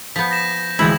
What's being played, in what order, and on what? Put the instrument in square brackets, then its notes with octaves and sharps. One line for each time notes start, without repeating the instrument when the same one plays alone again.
[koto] F3 B3 [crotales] G6 B6
[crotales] A#6 E7
[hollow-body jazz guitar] D2 E3 G#3 [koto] F3 C4 E4 [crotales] F#7